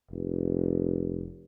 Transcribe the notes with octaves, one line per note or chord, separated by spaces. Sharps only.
F1